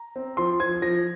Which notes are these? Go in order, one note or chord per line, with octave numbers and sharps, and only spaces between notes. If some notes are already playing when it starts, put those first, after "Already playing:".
Already playing: A#5
C4
F3 C6
F3 G#6
F3 A#6